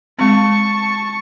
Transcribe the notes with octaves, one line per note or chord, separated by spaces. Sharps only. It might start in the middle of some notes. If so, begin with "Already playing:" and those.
G#3 C4 A5 C#6